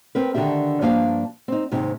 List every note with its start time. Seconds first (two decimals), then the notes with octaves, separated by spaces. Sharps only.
0.15 C4 A#4 B4
0.35 D3 D#3 D4 G4 E5
0.81 G2 F3 A#3 D4 F5
1.48 C4 D#4
1.71 D#2 G#2 C3 C4 D#4